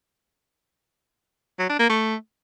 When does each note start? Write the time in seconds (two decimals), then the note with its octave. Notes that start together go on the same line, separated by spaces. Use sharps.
1.59 F#3
1.69 D4
1.79 A#3
1.89 A3